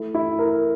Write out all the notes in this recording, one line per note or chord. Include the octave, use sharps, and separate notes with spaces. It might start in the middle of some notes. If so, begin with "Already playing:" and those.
Already playing: A3 E4
E4
A#4